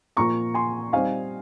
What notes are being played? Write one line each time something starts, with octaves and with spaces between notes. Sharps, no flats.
A#2 F3 A#3 A#5 C#6
G#5 C6
G3 C4 D#4 F5 G#5